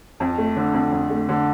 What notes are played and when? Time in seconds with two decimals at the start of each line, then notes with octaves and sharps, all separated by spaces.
0.20 F2
0.38 A3
0.56 D3
0.74 F2
0.92 F2
1.10 A3
1.29 D3